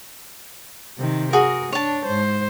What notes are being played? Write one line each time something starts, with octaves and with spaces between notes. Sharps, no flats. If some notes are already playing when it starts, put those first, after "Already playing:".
C3 D#3
F#4 G#4 A#4
D4 C#5 A5
G#2 C5